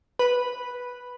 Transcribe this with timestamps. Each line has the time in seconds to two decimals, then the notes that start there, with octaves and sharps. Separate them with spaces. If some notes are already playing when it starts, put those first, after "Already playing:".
0.19 B4